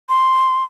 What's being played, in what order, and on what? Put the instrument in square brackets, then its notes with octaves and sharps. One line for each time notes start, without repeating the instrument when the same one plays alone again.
[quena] C6